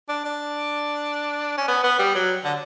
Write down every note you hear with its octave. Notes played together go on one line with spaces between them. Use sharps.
D4
D4
C#4
B3
B3
G3
F#3
D3